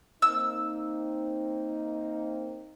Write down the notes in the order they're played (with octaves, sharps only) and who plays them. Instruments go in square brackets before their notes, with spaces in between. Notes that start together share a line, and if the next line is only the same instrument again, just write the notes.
[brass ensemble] A#3 C4 D#4 [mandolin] E6